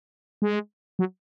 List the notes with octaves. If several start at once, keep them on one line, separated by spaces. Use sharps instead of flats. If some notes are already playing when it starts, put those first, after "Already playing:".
G#3
F#3